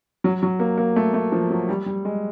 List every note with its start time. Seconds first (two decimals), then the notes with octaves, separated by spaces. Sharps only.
0.24 F#3
0.43 F#3
0.60 A#3
0.78 A#3
0.96 A3
1.14 A3
1.32 F3
1.50 F#3
1.69 G3
1.86 G3
2.05 G#3